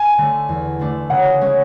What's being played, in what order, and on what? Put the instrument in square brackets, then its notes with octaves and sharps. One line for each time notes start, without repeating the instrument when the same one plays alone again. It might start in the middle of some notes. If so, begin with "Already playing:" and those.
Already playing: [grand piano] G#5
[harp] D3 A3 D4
E2
D3 A3 D4
[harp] C#3 [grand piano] F#5
[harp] G#3 C#4